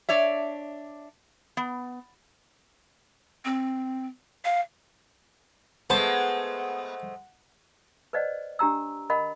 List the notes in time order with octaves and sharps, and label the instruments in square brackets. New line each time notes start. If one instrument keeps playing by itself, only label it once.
[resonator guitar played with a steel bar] D4 C#5 D5 E5
B3
[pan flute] C4
F5
[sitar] G#3 A3 C5 [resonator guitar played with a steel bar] B3 [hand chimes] F#5 [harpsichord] A5
[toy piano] B4 C5 D5 D#5 F#5
D4 G4 A#5 E6
A#4 D#5 F#5 B5